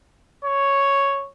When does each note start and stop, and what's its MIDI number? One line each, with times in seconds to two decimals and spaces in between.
0.44 1.28 73